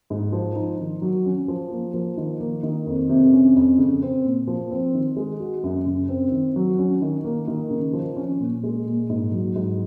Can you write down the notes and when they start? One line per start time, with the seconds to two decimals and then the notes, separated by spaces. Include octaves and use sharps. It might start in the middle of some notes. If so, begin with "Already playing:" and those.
0.10 G#2
0.32 F3
0.55 D#4
0.80 D#3
1.02 F#3
1.26 C#4
1.48 F3
1.71 A#3
1.94 F3
2.17 D#3
2.40 A#3
2.63 D#3
2.87 F2
3.09 C3
3.33 C#4
3.56 F2
3.79 C#3
4.02 C4
4.25 A#2
4.47 F3
4.71 C4
4.94 D#3
5.16 G#3
5.40 F#4
5.64 F#2
5.86 C#3
6.09 C4
6.32 D#3
6.56 F#3
6.79 C#4
7.02 D#3
7.24 A#3
7.48 D#3
7.71 C#3
7.93 F3
8.17 C#4
8.40 A#2
8.63 G#3
8.86 A#2
9.10 G#2
9.32 F#3
9.56 G#2